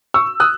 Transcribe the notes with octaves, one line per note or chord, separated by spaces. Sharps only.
C#6 E6
D#6 F#6